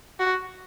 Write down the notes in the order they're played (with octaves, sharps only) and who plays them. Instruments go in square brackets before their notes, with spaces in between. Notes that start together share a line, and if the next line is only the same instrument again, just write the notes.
[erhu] F#4